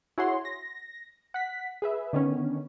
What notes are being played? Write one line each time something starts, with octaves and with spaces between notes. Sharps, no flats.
E4 F#4 G#4 C#5 F#5 C6
A#6
F#5 B6
G#4 B4 E5
D3 D#3 B3 C#4